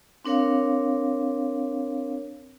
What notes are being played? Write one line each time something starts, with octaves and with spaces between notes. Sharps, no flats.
C4 D4 A#4 C#5 F5